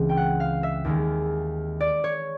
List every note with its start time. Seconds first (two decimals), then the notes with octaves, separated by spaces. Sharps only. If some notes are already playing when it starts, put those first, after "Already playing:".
Already playing: C#2 C#3 E3 C4
0.09 G5
0.17 F#5
0.40 F5
0.63 E5
0.85 D#2 D#3 G#3
1.81 D5
2.04 C#5